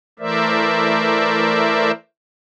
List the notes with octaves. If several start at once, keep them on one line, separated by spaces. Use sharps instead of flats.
E3 A3 A#4 C5 D5 E5